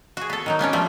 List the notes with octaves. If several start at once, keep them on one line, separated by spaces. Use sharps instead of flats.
F#4 G#4
B3 A4
D#3 F#3 D#4
A#3 B3 C#4 D4
F3 G3 A3